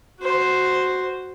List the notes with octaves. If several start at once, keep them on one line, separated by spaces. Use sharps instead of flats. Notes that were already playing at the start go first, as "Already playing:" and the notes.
F#4 C5